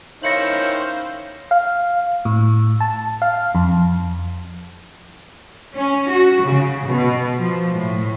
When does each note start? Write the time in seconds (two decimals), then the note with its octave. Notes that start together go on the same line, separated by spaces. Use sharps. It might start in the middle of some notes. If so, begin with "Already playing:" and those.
0.23 D#3 C#4 E4 C5 F5 A#6 C#7 F#7
1.51 F5
2.25 A2
2.80 A5
3.22 F5
3.55 F2
5.77 C#4
6.11 F#4
6.45 C#3
6.90 B2
7.39 F3
7.75 A2